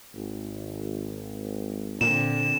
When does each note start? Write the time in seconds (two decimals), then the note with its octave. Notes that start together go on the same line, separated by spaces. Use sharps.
0.15 G#1
2.01 A#2 D3 C4 E7